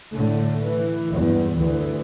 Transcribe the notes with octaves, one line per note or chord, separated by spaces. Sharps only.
A2 D3 A3
E3
E2 G2
D2 E3